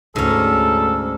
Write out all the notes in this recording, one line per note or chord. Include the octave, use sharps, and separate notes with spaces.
D2 G#2 C#4 A4